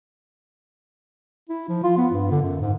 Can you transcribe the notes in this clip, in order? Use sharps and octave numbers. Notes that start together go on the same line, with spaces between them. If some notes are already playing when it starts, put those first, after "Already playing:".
E4
F3
F4
B3
G2
D3
F#2
G#2